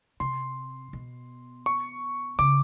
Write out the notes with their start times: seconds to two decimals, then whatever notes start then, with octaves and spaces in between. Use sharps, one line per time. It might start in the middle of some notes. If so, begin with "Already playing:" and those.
0.20 C3 C6
0.93 B2
1.66 C#6
2.39 C#3 D6